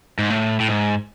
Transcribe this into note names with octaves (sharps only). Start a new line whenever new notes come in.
G#2
A2
A2
G#2